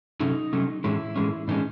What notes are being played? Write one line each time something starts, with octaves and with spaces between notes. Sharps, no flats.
C3 F#3 A3 C#4 D#4
C3 F#3 A3 C#4
A2 E3 G#3 C#4 E4
A2 E3 G#3 C#4
A2 E3 G#3 C#4 D#4